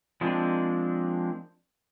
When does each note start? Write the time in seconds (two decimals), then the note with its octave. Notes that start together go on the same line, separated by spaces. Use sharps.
0.21 F3 G#3 A#3 C4 D4